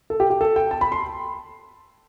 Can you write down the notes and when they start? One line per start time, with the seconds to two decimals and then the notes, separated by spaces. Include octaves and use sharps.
0.10 A4
0.20 G4
0.30 G4
0.41 A4
0.56 G5
0.71 A5
0.81 B5
0.92 C6